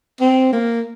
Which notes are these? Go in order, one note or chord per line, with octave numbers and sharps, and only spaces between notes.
C4
A#3